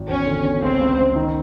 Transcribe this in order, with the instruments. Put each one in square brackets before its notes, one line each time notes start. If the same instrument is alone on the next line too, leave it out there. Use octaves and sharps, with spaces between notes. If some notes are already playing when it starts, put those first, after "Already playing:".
Already playing: [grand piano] G#1
[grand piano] E1 [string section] C#4
[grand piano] D3
E1
[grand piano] C#2 [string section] C4
[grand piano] C#2
C#2
D#3